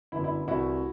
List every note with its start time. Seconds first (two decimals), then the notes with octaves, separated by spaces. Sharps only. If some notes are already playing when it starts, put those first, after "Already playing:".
0.12 G1 F#2 D3 E4
0.24 E4
0.48 C2 C3 E3 A3 E4 F#4